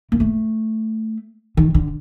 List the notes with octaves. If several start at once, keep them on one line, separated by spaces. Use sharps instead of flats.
A#3
A3
D#3
D3